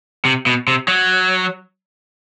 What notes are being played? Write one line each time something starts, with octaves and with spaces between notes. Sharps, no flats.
C3
B2
C3
F#3